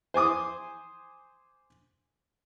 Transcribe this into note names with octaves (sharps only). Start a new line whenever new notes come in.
C5 G#5 D6 D#6